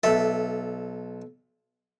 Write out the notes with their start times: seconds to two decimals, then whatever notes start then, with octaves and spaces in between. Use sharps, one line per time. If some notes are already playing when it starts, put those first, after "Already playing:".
0.03 B1 A4 E5